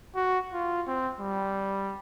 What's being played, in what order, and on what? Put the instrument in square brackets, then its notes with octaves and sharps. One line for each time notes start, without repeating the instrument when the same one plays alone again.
[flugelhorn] F#4
F4
C4
G3